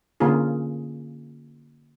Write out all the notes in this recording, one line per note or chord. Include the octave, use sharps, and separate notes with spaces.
D3 A#3 C#4 F4 G#4